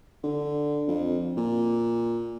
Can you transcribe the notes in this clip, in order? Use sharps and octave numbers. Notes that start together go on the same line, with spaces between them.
D3
F2
A#2